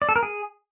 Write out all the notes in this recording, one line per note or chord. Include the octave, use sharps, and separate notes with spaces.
D5
A4
A#4
G#4